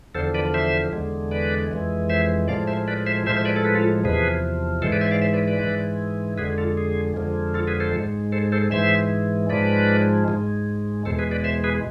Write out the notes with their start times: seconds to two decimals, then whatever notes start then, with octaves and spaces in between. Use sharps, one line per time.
0.15 E2 D3 F3 A4 C5
0.34 B4 D5
0.54 C5 E5
0.93 E2 D3 G#3
1.31 B4 D5
1.71 F2 E3 G#3
2.10 C5 E5
2.48 A2 F3 G#3 D5 F5
2.67 C5 E5
2.88 B4 D5
3.06 C5 E5
3.26 A2 F3 G#3 C5 E5
3.36 C5 E5
3.45 B4 D5
3.56 A4
3.65 B4
3.75 F4 A4
4.04 E2 C3 F3 G#4 B4
4.82 G#2 E3 G#3 A4 C5
4.92 B4 D5
5.01 C5 E5
5.11 D5 F5
5.22 C5 E5
5.34 B4 D5
5.47 B4 D5
5.60 G#2 E3 G#3
6.38 F2 D3 G#3 G#4 B4
6.58 F4 A4
6.77 G#4
7.16 F2 D3 F3 G#3
7.54 F4 A4
7.67 G#4 B4
7.80 A4 C5
7.94 G#2 G#3
8.32 A4 C5
8.52 A4 C5
8.71 G#2 E3 G#3 C5 E5
9.49 G#2 F3 G#3 B4 D5
10.28 G#2 G#3
11.05 E2 B2 G#3 A4 C5
11.19 G#4 B4
11.31 B4 D5
11.44 C5 E5
11.64 G#4 B4